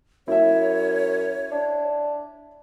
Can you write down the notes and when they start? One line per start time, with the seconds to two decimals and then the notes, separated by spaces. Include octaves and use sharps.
0.28 F#2 E4 C#5 E5
1.52 D4